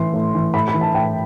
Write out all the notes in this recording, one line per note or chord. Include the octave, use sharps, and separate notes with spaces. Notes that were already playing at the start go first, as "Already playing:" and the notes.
Already playing: A2 E3 C6
A2
E3
A2 B5
B5
E3
A5
A2 G5